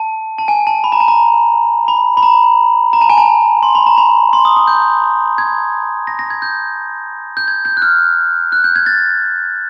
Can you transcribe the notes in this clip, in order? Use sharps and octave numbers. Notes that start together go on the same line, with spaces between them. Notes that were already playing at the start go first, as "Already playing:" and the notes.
Already playing: A5
A5
G#5
A5
B5
A#5
A5
A#5
B5
B5
A#5
A#5
A5
G#5
A5
C6
B5
A#5
B5
C6
D#6
D#6
G6
G#6
A#6
A#6
G#6
G6
G6
G#6
G6
F#6
F6
F#6
G6
G#6
A6